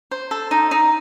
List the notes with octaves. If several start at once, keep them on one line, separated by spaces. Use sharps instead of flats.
C5
A4
D#4
D#4